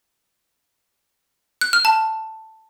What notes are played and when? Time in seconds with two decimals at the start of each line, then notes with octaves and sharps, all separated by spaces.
1.61 F#6
1.73 F6
1.85 A5